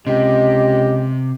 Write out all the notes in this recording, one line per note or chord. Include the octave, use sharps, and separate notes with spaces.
C#2 C3 G4 D#5